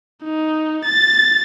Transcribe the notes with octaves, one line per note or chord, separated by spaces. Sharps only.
D#4
A6